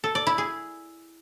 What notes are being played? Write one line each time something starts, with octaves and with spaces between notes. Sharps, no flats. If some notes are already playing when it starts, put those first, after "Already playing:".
A4
D5
E4
G#4